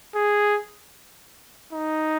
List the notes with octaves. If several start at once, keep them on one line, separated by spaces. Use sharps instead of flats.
G#4
D#4